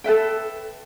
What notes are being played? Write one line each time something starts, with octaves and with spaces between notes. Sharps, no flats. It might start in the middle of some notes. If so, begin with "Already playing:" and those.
A4 B4 E5 G5